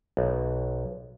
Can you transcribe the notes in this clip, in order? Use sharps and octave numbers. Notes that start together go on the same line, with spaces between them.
B1